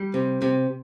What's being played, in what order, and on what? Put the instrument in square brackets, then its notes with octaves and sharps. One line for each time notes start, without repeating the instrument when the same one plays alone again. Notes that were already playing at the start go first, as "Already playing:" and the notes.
Already playing: [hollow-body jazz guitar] G3
C3
C3